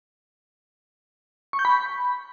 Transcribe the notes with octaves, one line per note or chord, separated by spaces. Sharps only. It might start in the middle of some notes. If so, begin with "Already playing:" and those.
C#6
G6
B5